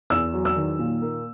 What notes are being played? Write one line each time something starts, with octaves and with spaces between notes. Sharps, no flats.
E2 E6
F#3
E6
D#3
A#2
A#3